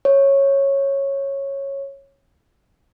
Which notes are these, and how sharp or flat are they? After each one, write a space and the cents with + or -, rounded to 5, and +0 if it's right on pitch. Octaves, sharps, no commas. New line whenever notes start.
C#5 -10